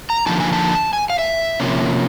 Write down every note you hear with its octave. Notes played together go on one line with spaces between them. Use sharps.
A#5
D3 F3 A#3 D#4 A5
G#5
A5
G#5
F5
E5
C3 F3 A#3 C#4